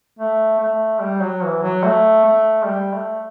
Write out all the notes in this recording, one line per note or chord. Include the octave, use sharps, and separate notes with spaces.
A3
A3
G3
F#3
E3
F#3
A3
A3
G3
A3